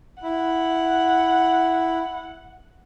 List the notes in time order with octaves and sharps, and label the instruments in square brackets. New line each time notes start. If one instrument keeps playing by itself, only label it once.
[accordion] E4 [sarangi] F#5